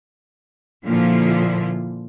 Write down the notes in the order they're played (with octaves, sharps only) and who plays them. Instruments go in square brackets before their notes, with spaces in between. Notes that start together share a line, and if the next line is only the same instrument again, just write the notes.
[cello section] A#2 D3 F3 E4 F4